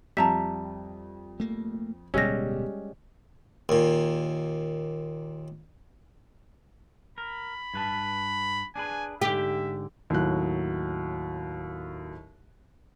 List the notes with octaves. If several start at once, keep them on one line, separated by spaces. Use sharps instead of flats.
F2 G3 E5 A5 A#5 B6
A3 A#3
D1 B2 G3 G#3 C#4 G4 E6 A#6
D#2 A#2
A#4 B5
G2 B4 A5
D4 G#4 B4 G#5
G#2 D3 G4 E5
D#2 A2 F#3 F#6